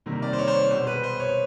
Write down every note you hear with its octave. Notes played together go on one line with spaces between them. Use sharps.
C3 D#3 G3 A#3
D5
C5
C#5
C5
C#5
B2 G#3 C5
B4
C5
C#5